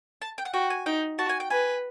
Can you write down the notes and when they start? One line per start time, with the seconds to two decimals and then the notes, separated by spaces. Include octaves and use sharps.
0.22 A5
0.38 G5
0.45 F#5
0.54 F#4 G5
0.70 G#5
0.86 D#4 G5
1.18 F#4 A5
1.29 G#5
1.40 G5
1.50 B4 G#5